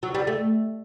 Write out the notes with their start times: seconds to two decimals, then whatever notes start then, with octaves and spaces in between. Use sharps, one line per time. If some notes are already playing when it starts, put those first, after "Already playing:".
0.03 F#3
0.15 G3
0.27 A3